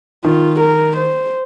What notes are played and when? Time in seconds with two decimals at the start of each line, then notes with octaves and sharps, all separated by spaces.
0.24 D#3 F4
0.60 A#4
0.97 C5